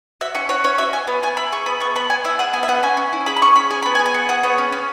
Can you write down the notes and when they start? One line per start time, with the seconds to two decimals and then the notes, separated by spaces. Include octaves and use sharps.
0.21 F#4 E5
0.35 C#4 F#5
0.49 F#4 C#5
0.64 C#4 C#5
0.78 F#4 E5
0.93 C#4 G#5
1.07 B3
1.23 B3 G#5
1.37 E4 B5
1.52 G#4 C#6
1.66 B3 B5
1.80 B3 C#6
1.96 B3 B5
2.10 B3 G#5
2.24 E4 E5
2.39 G#4 F#5
2.53 B3 G#5
2.63 E5
2.68 B3 F#5
2.83 C#4 G#5
2.97 C#4
3.13 E4
3.26 G#4 B5
3.37 B5
3.42 C#4 C#6
3.56 C#4 B5
3.71 G#4 G#5
3.82 B3 B5
3.95 G#5
3.99 G#4
4.06 G#5
4.14 B3 F#5
4.29 G#4 F#5
4.43 B3 C#5
4.58 C#4
4.72 C#4